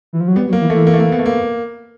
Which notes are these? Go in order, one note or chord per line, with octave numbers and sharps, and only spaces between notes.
E3
F3
F#3
G3 B3
F#3
A#3
E3
A3
E3
A#3
A3
A#3
B3
A3
A#3